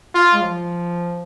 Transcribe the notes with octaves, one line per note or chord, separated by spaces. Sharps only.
F4
G#3
F3